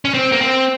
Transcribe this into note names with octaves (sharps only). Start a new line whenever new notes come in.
C#4
C4
A#3
C4